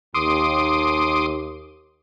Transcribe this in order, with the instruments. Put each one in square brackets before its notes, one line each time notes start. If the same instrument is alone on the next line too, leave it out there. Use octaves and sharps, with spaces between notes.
[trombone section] D#2 [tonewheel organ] C6 D6 D#6